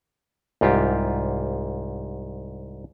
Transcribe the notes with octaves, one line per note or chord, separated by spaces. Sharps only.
C2 G#2 F4 G4